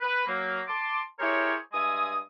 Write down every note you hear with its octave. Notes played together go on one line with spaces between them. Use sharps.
B4
F#3 A#3
A5 C6 D6
E4 G4 G#4 A#4 C5 C#5
G2 G#3 E5 G#5 D#6